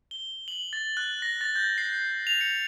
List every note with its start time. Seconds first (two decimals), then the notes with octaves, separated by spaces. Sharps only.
0.11 G7
0.48 F#7
0.73 A6
0.97 F#6
1.22 A#6
1.41 A6
1.56 G6
1.78 C7
2.27 F7
2.41 C#7